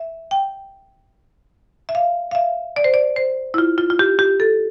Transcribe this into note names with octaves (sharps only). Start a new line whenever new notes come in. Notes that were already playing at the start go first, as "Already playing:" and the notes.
Already playing: E5
G5
E5
F5
F5
E5
D5
C5
D5
C5
E4
F4
F4
F4
G4
G4
A4